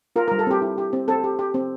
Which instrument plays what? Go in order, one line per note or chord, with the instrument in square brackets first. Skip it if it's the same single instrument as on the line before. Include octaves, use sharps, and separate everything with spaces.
[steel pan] F4 A#4
G3 A#4
A4
C4 G4
E4
G4
C4
C4 A4
G4
G4
C4